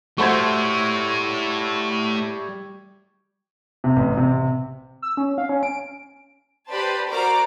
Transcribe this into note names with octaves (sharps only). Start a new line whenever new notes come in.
G3 A3 E4 F#4 A4 C5 C#6 G#6
C3
A1
C3
E6
C#4
F5
C#4
D7
G4 B4 C5 D5 A5 B5
F#4 A#4 C5 D5 A#5 D6